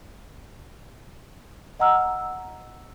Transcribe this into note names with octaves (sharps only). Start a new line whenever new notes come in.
D#5 F#5 A#5 E6 F6